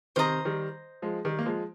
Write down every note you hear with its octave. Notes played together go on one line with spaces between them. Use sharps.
C3 D#3 C5 D#5 A#5
D#3 G3
F3 G#3
D#3 G3
A#3
F3 G#3